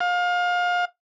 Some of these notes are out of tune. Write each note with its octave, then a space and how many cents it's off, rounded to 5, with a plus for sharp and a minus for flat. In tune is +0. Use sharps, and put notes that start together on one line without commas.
F5 +30